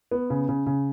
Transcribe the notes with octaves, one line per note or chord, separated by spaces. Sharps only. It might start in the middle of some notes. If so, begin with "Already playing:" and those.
B3
C#3
C#3
C#3